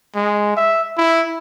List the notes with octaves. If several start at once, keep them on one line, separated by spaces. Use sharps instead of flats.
G#3
E5
E4